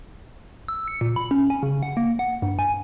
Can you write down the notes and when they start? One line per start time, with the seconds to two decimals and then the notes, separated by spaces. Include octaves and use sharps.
0.68 E6
0.88 C#7
1.01 A#2
1.16 B5
1.31 C#4
1.50 G#5
1.63 C#3
1.83 F#5
1.97 A#3
2.19 F#5
2.42 G2
2.59 G#5